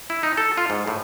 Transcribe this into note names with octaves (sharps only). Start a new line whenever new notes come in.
E4
D#4
A4
F4
G#2
A2